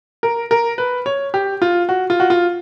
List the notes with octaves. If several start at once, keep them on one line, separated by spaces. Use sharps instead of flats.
A#4
A#4
B4
C#5
G4
F4
F#4
F4
F#4
F4